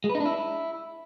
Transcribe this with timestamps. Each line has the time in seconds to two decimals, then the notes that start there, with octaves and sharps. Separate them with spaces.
0.04 G#3
0.09 B4
0.15 D#4
0.20 D4
0.26 E4